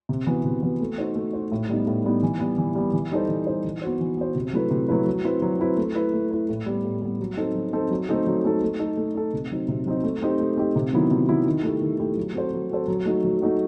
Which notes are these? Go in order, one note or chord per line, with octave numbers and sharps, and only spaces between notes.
C3
E3 B3 F#4 B4
C3
E3 B3 F#4 B4
A3
D#4 F#4 C5
A3
D#4 F#4 C5
A2
G3 B3 D#4
A2
G3 B3 D#4
E3
G3 B3
E3
G3 B3
E3
G3 D#4 A4 C5
E3
G3 D#4 A4 C5
E3
B3 F#4 C5
E3
B3 F#4 C5
C3
F#3 A3 E4 B4
C3
F#3 A3 E4 B4
F#3
C4 E4 B4
F#3
C4 E4 B4
A3
E4 B4
A3
E4 B4
A2
G3 B3
A2
G3 B3
F#3
C4 D#4 A4
F#3
C4 D#4 A4
F#3
A3 C4 D#4 A4
F#3
A3 C4 D#4 A4
A3
D#4 A4
A3
D#4 A4
C3
F#3 C4 D#4
C3
F#3 C4 D#4
A3
C4 D#4 G4
A3
C4 D#4 G4
C3
D#3 F#3 B3 E4
C3
D#3 F#3 B3 E4
D#3
A3 E4 G4
D#3
A3 E4 G4
F#3
C4 F#4 A4 C5
F#3
C4 F#4 A4 C5
F#3
A3 D#4 F#4
F#3
A3 D#4 F#4